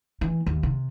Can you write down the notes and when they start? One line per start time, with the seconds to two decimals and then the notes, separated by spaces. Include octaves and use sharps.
0.21 E3
0.46 D#2
0.63 C3